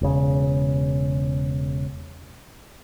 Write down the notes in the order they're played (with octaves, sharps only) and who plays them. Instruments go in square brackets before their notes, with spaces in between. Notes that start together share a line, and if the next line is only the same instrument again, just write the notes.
[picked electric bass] E1 C#3